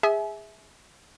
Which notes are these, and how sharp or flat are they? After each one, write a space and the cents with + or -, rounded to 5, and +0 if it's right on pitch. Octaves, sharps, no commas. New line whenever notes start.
G#4 -15 E5 -15 G#5 +35